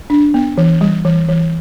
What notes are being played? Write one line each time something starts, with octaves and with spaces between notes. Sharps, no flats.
D4
B3
E3
G3
E3
E3